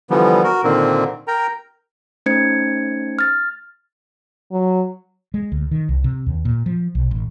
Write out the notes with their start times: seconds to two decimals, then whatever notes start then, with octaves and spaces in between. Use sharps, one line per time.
0.10 D3 E3 F3 G3 B3
0.44 F#4 A#4
0.64 A#2 D3 D#3 A#3 C4
1.28 A#4 G5 A#5
2.26 A3 C#4 D#4 C5 G#6 C#7
3.19 F6 A6
4.52 F#3
5.34 G#3
5.52 D2
5.71 D#3
5.89 C2
6.04 C3
6.26 D#2
6.45 A#2
6.66 F3
6.95 B1
7.11 A1